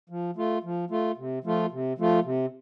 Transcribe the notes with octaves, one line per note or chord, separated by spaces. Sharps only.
F3
A3 F4
F3
A3 F4
C3
F3 A3 F4
C3
F3 A3 F4
C3